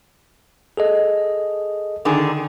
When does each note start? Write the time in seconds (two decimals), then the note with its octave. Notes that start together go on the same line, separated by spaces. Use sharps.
0.77 G#4 A4 D#5
2.05 D3 D#3 G#4